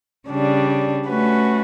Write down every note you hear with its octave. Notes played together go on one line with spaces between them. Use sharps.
C#3 G3 D4
A3 C#4 F#4 B4